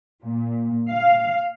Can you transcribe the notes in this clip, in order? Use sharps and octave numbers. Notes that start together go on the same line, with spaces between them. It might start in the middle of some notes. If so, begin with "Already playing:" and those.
A#2
F5